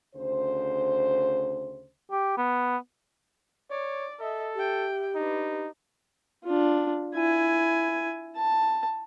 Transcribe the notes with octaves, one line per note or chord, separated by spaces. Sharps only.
D2 C#3 C5
G4
B3
C#5 D5
A4 D#5 E5
G4 E5 G5
D4 D#4 B4
D4 F4
E4 G#5
A5